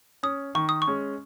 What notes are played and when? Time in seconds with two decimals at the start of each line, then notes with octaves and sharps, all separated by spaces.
0.23 C#4 D#6
0.55 D#3 C#6
0.69 D#6
0.82 C#6
0.87 G#3 C#4